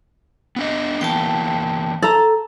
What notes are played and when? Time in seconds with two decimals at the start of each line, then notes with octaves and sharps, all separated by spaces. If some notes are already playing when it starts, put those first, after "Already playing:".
0.56 B3 D4 D#5
1.01 E3 A#3 B3 G5 A5
2.02 A4 A#5